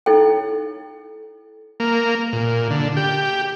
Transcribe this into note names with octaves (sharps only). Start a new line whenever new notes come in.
D#4 E4 A4 C#5 G5
A#3
A#2
D3
G4